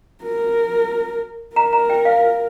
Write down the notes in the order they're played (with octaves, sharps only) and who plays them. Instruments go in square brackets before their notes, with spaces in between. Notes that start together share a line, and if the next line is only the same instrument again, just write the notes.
[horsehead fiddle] A#4
[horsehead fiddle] A#4 [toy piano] A#5
[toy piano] A#5
G5
F5